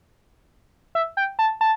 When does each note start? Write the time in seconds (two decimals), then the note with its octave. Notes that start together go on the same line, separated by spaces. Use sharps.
0.95 E5
1.17 G5
1.39 A5
1.61 A5